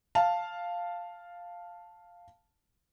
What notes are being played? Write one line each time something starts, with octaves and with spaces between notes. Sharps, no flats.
F5 A5